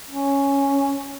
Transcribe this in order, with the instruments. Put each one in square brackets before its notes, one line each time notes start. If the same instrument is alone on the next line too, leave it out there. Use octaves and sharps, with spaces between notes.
[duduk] C#4